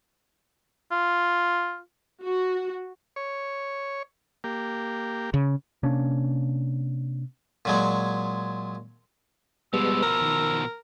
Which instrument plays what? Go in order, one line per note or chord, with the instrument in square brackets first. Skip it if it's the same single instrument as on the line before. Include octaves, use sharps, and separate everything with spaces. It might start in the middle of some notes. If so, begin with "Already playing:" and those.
[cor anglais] F4
[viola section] F#4
[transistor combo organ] C#5
A#3 G4
[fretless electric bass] C#3
[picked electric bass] C3 A#3 C#4 D4
[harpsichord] A#2 F#3 G#3
[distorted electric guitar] B2 F3 [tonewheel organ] G3 G#3 B3 [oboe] E6
[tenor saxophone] A#4
[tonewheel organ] D#3